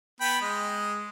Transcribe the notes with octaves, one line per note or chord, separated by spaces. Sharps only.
B3 G5 B5
G#3 D#5